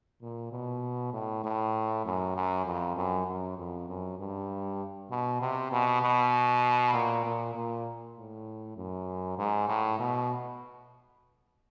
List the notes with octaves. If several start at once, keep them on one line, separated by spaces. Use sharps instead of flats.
A#2
B2
A2
A2
F#2
F#2
F2
F#2
F#2
F2
F#2
G2
B2
C3
B2
B2
A#2
A#2
A#2
A2
F#2
G#2
A2
B2